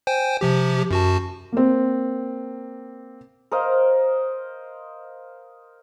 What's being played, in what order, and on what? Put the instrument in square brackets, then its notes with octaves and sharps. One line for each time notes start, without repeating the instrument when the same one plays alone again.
[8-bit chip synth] C5 G5 G#5
C3 F3 G4
F#2 F#4 A5
[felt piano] A#3 C4
[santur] A#4 C5 D#5 F5